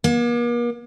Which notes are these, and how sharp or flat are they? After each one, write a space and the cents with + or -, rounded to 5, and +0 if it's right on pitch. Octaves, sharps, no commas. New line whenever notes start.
A#3 +45